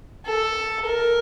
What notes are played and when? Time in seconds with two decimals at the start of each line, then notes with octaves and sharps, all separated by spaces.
0.26 A4
0.86 A#4